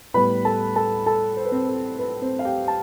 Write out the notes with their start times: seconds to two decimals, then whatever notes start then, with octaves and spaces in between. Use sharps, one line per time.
0.14 A2 G3 B3 B4 B5
0.45 A4 A5
0.76 A4 A5
1.06 A4 A5
1.37 C5
1.45 B4
1.52 C4 C5
1.68 A4
1.99 B4
2.22 C4 C5
2.39 F5
2.45 G4 G5
2.68 A5